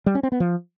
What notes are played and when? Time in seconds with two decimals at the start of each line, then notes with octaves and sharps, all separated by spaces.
0.06 G3
0.15 C#4
0.23 C4
0.32 B3
0.40 F3